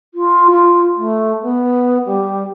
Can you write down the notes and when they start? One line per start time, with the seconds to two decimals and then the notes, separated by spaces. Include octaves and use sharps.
0.14 F4
0.50 F4
0.96 A3
1.42 B3
2.05 G3